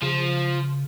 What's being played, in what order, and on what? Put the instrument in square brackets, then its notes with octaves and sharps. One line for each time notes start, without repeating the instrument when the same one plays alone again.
[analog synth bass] C#3 [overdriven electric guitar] F3